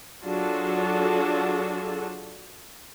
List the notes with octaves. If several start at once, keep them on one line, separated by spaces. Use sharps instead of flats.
F#3 D4 F4 F#4 G#4 A4